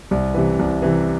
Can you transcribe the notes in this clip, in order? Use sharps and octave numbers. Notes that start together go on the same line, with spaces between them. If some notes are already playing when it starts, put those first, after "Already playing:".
C2
C3 E3
C2
C3 E3